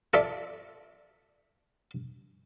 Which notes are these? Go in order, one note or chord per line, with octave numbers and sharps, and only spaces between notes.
F4 A4 D5 E5 D6